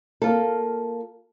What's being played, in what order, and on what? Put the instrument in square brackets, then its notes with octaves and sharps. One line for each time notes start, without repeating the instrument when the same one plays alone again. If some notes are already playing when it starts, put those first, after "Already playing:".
[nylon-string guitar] A#3 F4 A4